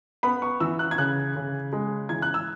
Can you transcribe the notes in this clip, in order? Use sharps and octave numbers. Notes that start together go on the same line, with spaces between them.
B3 B5
C#6
E3 E6
F#6
G#6
C#3 F#6
C#3
G#3
E3 G#6
F#6
E6